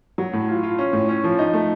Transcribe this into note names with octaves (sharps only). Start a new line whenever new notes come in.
F#3
A2
F4
F4
C#4
A2
C#4
F3
D#4
A3